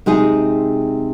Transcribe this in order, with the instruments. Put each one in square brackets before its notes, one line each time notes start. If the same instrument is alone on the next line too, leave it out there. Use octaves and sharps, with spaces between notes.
[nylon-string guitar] C3 G#3 D#4 G#4